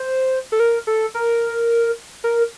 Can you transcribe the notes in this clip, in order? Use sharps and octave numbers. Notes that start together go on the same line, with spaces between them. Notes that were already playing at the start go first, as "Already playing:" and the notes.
Already playing: C5
A4
A#4
A4
A#4
A#4